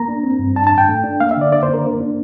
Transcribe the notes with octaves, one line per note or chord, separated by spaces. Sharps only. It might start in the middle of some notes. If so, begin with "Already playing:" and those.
Already playing: A#3 A#5
D4
C4
G2
D4 A5
A5
A2
G5
A3
D4
A#3 F5
E5
D3 D5
A#3 D5
C5
D4
A#4
A#3
D4